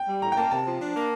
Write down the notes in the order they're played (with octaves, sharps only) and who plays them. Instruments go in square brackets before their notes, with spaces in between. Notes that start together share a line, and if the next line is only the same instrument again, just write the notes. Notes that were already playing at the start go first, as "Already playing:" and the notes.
Already playing: [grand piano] G5
[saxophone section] G3
[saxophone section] A2 [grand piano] A#5
[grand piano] G5
[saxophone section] A#3 [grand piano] A5
[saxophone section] C3 [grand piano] A5
[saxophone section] F3
D4
A#3